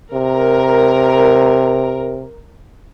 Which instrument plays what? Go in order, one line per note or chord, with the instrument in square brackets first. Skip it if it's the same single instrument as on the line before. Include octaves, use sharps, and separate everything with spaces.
[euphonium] C3 [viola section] A#4